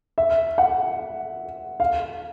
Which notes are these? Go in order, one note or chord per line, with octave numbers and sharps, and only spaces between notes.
E5
F#5
F5